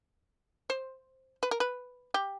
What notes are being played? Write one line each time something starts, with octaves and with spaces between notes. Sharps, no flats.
C5
B4
A#4
B4
G4